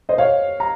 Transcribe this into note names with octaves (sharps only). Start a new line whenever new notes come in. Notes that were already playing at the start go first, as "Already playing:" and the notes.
C5 D#5
C#5 F5
A#5